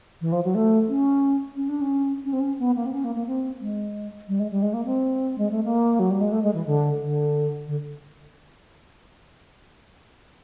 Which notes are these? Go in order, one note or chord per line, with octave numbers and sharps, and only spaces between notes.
E3
F3
F#3
A3
C#4
C#4
D4
C#4
C#4
C4
C#4
B3
A#3
C4
C#4
A#3
A#3
C4
G#3
G3
G#3
G3
G#3
A#3
C4
G#3
A3
A#3
F#3
G3
G#3
A3
G#3
E3
D3
D3
D3